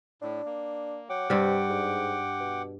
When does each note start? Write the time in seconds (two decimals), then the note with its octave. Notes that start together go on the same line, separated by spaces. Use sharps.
0.22 A2 D4
0.45 A#3
1.09 F#3 F#5 G5 D6
1.30 G2 C3 G3
1.69 G#2
2.40 B2